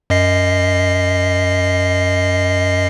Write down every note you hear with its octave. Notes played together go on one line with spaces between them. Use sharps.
F#2 D#5 C7